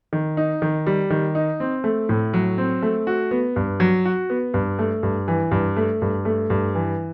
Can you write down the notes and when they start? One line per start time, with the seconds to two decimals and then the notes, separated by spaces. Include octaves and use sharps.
0.13 D#3
0.37 D#4
0.62 D#3
0.87 G3
1.10 D#3
1.35 D#4
1.60 C4
1.84 A3
2.09 A2
2.34 F#3
2.58 C4
2.82 A3
3.07 F#4
3.31 B3
3.56 G2
3.80 F#3
4.05 F#4
4.30 B3
4.54 G2
4.79 A3
5.03 G2
5.28 E3
5.51 G2
5.76 A3
6.02 G2
6.25 A3
6.50 G2
6.75 E3